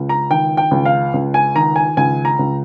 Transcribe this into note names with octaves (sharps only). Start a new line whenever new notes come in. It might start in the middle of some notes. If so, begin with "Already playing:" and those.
Already playing: C#2
A#5
D#3 G5
G5
C#2
F5
C#2
G#5
D#3 A#5
G#5
C#2 G#5
A#5
C#2